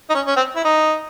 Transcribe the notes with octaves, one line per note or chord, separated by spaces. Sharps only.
D#4
C#4
C#4
C4
E4
D#4